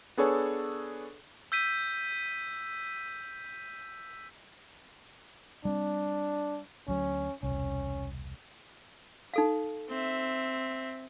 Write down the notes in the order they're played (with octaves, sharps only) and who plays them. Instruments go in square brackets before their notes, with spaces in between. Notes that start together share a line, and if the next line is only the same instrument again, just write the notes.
[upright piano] B3 D4 G#4 A4 C#5
[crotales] E6 G6 B6 D#7
[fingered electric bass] G3 A3 C4 [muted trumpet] D4
[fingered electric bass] D2 F#3 [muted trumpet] C#4
[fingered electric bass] E1 C2 [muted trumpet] C#4
[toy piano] D#4 A4 F5
[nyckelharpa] C4 E5